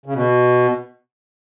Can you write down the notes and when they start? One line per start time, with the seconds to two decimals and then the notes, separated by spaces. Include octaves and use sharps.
0.06 C#3
0.14 B2